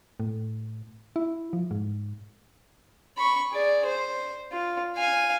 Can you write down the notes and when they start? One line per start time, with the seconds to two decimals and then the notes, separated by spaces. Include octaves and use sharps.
0.20 A2
1.16 E4
1.53 F3
1.71 G#2
3.17 B5 C#6
3.51 G#4 D5
3.86 C5
4.52 F4
4.96 F5 G#5